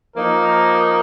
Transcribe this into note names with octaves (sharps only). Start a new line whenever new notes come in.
F3 A#3 D#4 A#4